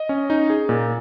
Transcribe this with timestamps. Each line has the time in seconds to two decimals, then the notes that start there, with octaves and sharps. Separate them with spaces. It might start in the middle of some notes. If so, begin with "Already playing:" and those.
Already playing: D#5
0.09 C#4
0.30 D#4
0.50 G#4
0.69 A#2